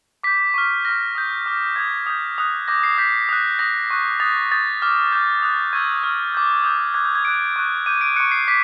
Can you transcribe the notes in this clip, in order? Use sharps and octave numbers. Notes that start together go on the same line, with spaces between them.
D6 G6 B6
C#6 F6
C#6 F6 A#6
D#6 G6
D6 F6
D#6 G6 G#6
D#6 G6
D#6 F#6
D6 G6 A#6
C7
D#6 G6 B6
D#6 F#6
D#6 F#6 A#6
C#6 F#6
D#6 F#6 A6
D#6 G6 A6
D6 F6
D6 F6 G6
D#6 F#6
C#6 E6 G6 G#6
C#6 F6
D6 G6
D#6 G6
D6 F#6 G#6
G6
G#6
D6 F#6 D7
C#6 F#6
D6 G6 D#7
D7
C#6 F#6 C#7
C7
D6 B6